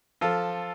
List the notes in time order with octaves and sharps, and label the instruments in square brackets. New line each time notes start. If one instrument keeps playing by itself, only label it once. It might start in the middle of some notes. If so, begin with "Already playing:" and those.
[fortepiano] F3 F4 A4